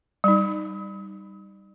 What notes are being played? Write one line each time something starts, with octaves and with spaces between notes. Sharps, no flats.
G3 D#4